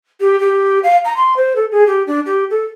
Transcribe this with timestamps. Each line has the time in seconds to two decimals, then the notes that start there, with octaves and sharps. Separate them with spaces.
0.20 G4
0.40 G4
0.83 F5
1.04 A#5
1.16 C6
1.36 C5
1.55 A4
1.71 G#4
1.86 G4
2.07 D4
2.26 G4
2.50 A4